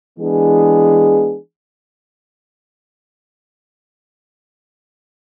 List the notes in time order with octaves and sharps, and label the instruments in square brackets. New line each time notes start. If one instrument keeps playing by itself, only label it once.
[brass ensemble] E3 G#3 B3 D4 G#4